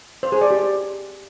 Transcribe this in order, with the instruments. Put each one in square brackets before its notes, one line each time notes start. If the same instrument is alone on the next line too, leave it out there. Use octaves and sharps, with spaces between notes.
[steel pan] C5
G#4
D5
G4